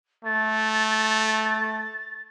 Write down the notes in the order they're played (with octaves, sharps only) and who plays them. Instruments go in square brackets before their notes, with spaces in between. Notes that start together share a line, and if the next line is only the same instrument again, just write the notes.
[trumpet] A3 [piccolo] A6